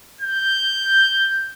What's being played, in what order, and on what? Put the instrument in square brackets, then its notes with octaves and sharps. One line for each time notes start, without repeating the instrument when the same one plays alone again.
[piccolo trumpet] G6